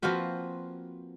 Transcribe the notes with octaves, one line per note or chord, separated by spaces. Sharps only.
F3 A#3 C4 F4 F#4 B4